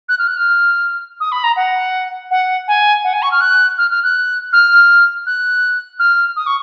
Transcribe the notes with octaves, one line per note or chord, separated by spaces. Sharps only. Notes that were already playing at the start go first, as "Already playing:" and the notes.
F#6
F6
F#6
F6
D#6
B5
A#5
F#5
F#5
G#5
F#5
G#5
C#6
F6
F#6
F6
F6
F#6
F6
F#6
F6
D#6
C#6